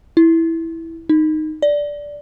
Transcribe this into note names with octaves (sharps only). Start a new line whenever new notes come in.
E4
D#4
D5